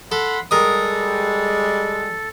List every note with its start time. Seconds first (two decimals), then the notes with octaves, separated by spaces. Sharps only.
0.12 A4 F#5 B5 C6
0.51 G3 G#3 A4 A#4 D#6